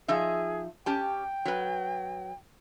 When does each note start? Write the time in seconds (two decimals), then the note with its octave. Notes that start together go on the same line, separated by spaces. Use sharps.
0.08 F3 D#4 G#4 E5
0.86 C#4 G4 G5 A5
1.45 F#3 B4